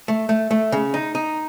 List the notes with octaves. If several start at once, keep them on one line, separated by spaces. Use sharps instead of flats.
A3
A3
A3
C#3
D#4
D#4